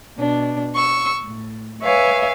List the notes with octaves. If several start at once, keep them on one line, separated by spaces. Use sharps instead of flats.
B2 D4
C#6 E6
A2
B4 C#5 E5 F5 G#5